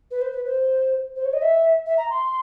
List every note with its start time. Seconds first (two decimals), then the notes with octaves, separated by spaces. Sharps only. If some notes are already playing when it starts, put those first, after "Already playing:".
0.11 B4
0.21 C5
0.32 B4
0.46 C5
1.16 C5
1.25 C#5
1.33 D#5
1.42 E5
1.86 E5
1.98 A#5
2.10 C6